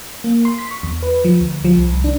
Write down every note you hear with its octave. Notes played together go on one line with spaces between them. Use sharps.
A#3
C6
B6
C#6
E2
B4
F3
D2
F3
C2
C2
D4